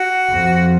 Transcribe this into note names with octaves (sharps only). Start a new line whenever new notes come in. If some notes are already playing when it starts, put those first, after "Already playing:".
Already playing: F#4
F2